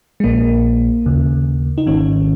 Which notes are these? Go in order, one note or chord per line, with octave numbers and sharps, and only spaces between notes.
G#3
A#1 A#2 A#3
D#2 C#3
D#4
G#1 G#2 D#3 C#4